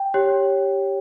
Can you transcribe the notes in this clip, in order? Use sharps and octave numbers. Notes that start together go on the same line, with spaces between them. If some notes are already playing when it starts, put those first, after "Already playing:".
Already playing: G5
G4 C#5